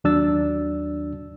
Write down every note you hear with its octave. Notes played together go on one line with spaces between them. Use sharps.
D#2 F#3 D4 E6 A6